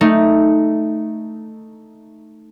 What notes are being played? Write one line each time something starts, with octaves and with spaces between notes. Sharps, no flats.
A3 D#4